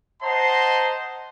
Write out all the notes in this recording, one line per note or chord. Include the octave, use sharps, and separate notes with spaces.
C5 D#5 F#5 A5 A#5 C6